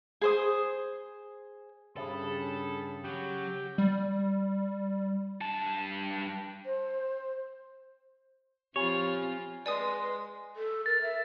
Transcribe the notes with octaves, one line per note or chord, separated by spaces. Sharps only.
G#4 C5 D#6
G2 C#3 G#4 A4 B5
F#3 F#4 G4
G3
G2 A5
C5
F3 C4 F4 G4 C#5 G#5 B5
G#3 B4 D5 G#5 C6 D#6
A4
A#4 A6
E5